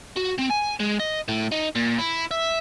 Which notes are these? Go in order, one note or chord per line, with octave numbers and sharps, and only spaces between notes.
F#4
C4
G#5
G#3
D#5
A2
D#4
A#2
E4
E5